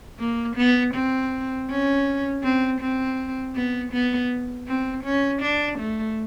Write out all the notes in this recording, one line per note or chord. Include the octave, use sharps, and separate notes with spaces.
A#3
B3
C4
C#4
C4
C4
B3
B3
C4
C#4
D4
A3